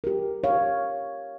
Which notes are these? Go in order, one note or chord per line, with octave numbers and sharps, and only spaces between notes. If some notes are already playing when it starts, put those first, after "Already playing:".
G4 A#4
C#5 F5